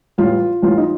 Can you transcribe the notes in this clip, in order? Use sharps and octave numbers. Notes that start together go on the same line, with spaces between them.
A1 A2 E3 G3 F4
A1 A2 E3 G3 F4
D#4